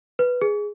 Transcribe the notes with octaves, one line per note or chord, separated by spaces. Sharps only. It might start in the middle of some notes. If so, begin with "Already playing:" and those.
B4
G#4